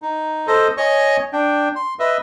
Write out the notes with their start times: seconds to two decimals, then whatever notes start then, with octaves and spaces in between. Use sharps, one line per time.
0.02 D#4
0.47 A4 C5 D#5
0.77 C#5 D#5 G#5 C#6
1.33 D4 G5
1.76 C6
1.99 B4 D#5 E5